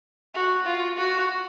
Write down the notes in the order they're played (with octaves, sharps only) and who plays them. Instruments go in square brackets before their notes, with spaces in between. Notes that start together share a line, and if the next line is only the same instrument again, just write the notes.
[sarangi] F#4
F4
F#4